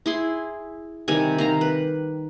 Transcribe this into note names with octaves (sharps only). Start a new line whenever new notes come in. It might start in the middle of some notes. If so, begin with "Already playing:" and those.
E4 G#4 C6
C3 D#3 G3 G#5
D#3 F5 A#5
B4